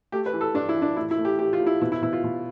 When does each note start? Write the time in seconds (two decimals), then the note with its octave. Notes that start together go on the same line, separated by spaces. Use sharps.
0.12 A3 G4
0.26 B4
0.33 E3
0.41 A4
0.54 G2 D4
0.69 E4
0.75 E3
0.82 D4
0.96 A2 E4
1.11 E4
1.18 A3
1.25 G4
1.39 A2 G4
1.53 F4
1.59 A2
1.67 E4
1.81 B2 E4
1.92 E4
2.02 B2 E4
2.13 F4
2.24 B2